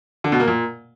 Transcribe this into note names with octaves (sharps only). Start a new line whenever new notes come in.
D3
B2
A#3
A#2